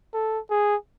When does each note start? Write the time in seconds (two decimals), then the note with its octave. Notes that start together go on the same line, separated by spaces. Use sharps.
0.14 A4
0.50 G#4